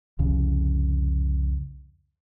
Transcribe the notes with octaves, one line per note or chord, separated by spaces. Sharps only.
C2 F2 C#3